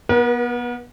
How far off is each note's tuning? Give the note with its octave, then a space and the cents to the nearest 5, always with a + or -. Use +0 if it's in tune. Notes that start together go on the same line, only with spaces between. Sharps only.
B3 -25 A#4 +45